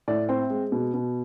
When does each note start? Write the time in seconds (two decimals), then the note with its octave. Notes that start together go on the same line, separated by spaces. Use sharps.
0.08 A2 D5
0.29 C4 C5
0.50 G#3
0.72 B2
0.94 B2